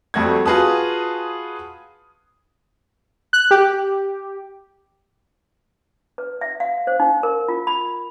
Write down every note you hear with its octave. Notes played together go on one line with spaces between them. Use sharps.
F2 G3 A3 F#4 G#6
F4 F#4 G#4 B4 A5 D#6
F#6
G4
B4
E5
F5
C5
D#4
A#4
F4
B5